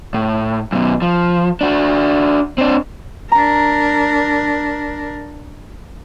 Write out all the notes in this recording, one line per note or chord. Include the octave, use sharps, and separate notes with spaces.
A2
F#2 B2
F3
D4 F#4
C4 D4
D4 A#4 A#5